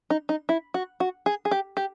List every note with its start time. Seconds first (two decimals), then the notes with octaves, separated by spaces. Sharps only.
0.10 D#4
0.29 D#4
0.49 E4
0.74 F#4
1.00 F#4
1.26 G#4
1.45 G#4
1.51 G4
1.77 G4